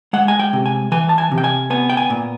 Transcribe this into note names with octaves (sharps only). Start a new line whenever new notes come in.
G#3 F#5
G#5
G5
C3
G#5
E3 G#5
A5
G#5
C3
G5
G#5
B3 G#5
G5
G#5
A#2